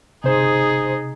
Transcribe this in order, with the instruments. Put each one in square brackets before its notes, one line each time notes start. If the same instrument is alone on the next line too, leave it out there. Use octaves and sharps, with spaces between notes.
[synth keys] G1 C5 [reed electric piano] C3 [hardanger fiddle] D#4 G#4